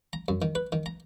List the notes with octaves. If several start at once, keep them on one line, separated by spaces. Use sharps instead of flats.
A#5
F#2
D#3
B4
D#3
A#5